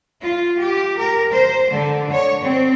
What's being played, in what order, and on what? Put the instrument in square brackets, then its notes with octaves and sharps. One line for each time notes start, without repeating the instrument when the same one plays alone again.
[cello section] F4
G4
A#4
C5
D3
C#5
C4